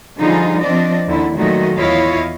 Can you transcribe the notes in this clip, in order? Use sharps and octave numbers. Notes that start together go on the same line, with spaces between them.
D3 F3 G3 D#4 F4 G#4
F3 C4 D4 D5 D#5
D#2 D3 E4
A#2 D#3 F#3 A3 F#4 D#5
E2 E4 F4 C#5 D#5 F5